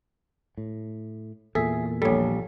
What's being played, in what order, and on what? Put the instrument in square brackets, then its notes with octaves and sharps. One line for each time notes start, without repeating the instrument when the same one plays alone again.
[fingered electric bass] A2
[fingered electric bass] E2 A#2 [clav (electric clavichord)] G#4 E5 [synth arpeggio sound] A4
[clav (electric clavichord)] A#1 G3 [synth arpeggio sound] A4 C#5